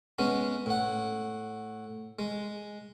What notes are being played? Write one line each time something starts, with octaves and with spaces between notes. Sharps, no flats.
G#3 B3 C#4
A2 F#5
G#3